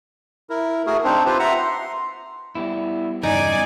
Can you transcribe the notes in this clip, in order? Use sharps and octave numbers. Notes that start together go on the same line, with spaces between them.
E4 A#4
A3 F#4 G#4 A#4
C4 D4 D#4 C5
F4 G4 B4 C5
E5 F#5 A#5
C6
G3 B3 E4
E2 G2 C#3 D#4 D5 G#5